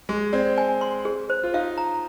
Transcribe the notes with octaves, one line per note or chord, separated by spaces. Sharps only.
G#3 G#4
C4 D5
G#5
C6
G#4
C5
F4
D#4 F5
A#5